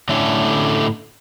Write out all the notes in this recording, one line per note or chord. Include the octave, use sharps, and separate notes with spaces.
A2 D3 A3 C#4